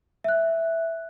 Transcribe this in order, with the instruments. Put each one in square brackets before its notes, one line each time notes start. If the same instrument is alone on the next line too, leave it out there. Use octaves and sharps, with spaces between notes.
[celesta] E5 F#6